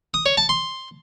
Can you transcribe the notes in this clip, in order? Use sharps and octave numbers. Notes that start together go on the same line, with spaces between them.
D#6
C#5
A5
C6